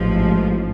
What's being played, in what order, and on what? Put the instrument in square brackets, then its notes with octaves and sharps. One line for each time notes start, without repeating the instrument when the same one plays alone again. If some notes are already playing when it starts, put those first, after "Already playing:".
Already playing: [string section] A1 G#2 F3